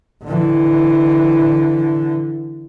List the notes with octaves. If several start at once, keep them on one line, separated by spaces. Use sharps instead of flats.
D3 E3